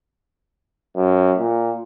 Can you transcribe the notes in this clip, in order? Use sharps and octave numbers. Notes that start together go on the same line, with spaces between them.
F#2
A#2